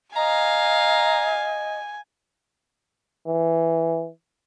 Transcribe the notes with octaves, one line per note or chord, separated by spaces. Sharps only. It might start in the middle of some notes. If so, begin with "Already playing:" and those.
D#5 F5 G#5 A#5
E3